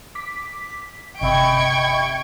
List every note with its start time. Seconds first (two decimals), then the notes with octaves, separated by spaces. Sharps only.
0.15 D6 B6
1.21 G1 C3 D#5 E5 G5 B5 C#6 G#6